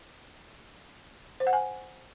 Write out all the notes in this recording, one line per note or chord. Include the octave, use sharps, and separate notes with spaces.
C5
F#5
G#5